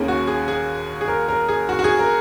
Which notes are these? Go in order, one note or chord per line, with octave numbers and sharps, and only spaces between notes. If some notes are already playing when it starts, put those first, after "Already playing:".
Already playing: D#2 D#3 A#3 C#4 G#4
F#4
G#4
G#4
G#4
A#4
A#4
G#4
F#4
F#4
G#4
A#4